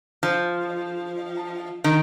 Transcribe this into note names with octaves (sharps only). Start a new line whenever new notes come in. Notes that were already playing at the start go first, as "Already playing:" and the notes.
F3
D#3